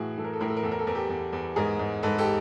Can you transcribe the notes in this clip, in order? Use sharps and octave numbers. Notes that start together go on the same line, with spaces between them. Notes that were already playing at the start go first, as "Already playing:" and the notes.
Already playing: A2 E3 F#4 G#4
E3 A4
A#4
A4
A2 A#4
A4
A#4
E2 A4
A#4
A4
E2 A#4
G4 A4
E2
E2
G#2 G#4 A#4
G#2
G#2 A4 B4
G4 A4